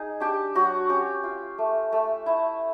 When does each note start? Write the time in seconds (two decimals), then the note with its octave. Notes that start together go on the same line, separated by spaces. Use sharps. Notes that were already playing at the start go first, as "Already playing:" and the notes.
Already playing: D#4 G#4
0.20 D4 G4
0.55 F#3 F#4
0.89 C#4 G4
1.23 F4
1.58 A3
1.92 A3
2.26 E4